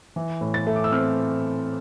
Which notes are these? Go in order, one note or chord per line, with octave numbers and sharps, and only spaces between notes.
E3
A2
A6
A3
D6
E6
C4 F6